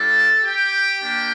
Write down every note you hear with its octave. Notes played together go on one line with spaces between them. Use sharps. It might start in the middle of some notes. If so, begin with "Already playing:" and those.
Already playing: G3 D4 F4 A4 A5
G4 G5
A#3 D4 G4